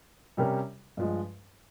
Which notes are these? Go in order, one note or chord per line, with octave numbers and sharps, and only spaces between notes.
C3 G3 C#4 G4 A#4
G2 F3 G#3